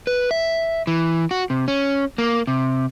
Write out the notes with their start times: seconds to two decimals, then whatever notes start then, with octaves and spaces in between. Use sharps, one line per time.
0.07 B4
0.31 E5
0.87 E3
1.31 F#4
1.50 C3
1.68 C#4
2.18 A#3
2.47 C3